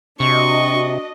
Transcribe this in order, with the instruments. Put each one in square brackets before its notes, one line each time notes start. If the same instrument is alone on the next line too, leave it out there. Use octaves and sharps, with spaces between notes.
[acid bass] C3 [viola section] D4 F#4 D#5 [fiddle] C#6